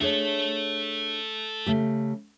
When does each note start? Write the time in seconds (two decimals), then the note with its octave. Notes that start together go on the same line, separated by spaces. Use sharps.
0.01 D4 G#4 A4 C#5 E5
1.66 C#3 A3 G4